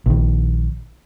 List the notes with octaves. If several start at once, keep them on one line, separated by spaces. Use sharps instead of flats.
A#1 D#3